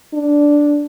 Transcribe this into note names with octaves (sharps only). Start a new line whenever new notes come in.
D4